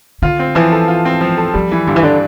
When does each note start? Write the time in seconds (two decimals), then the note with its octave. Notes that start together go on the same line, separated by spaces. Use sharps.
0.22 D3 F4
0.39 C4
0.55 E3 F3
0.72 A4
0.88 F4
1.05 C4
1.21 F3
1.37 A4
1.54 F3 G3
1.72 E3
1.87 G2 D3
1.96 E3
2.03 D3 D4